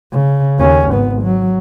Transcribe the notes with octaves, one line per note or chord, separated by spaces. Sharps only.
C#3
D#2 C#4
G#1 B3
F#3